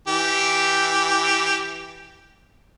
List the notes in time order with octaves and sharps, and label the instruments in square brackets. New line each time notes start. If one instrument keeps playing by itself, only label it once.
[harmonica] E3 G4